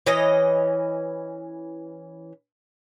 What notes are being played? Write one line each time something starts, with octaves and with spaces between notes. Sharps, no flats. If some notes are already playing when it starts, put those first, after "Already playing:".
E3 C#4 D#5